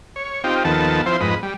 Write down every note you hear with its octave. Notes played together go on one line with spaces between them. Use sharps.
C#5
C4 D#4 F4 G4
D#2 D#3 F3 B3 A4 A5
F3 C4 E4 C5
F2 G#2 B4 D#5
G3